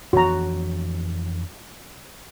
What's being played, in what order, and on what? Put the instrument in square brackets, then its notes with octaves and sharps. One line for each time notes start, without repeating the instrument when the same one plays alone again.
[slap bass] F2 E3 D4 [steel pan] F#4 A#5